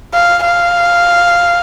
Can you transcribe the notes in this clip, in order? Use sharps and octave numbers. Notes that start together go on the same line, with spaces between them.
F5
F5